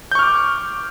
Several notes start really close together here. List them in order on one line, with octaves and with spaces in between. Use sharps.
G6 C#6 F6 D6